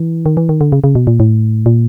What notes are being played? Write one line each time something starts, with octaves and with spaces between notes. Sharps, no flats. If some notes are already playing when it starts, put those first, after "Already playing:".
Already playing: E3
D#3
E3
D#3
D3
C#3
C#3
B2
A#2
A2
A#2